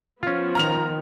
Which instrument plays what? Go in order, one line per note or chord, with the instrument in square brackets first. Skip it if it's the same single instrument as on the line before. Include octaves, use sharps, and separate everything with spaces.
[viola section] F3 B3 [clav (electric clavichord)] C#4 F4
[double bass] D#3 [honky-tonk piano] A#5 F6 F7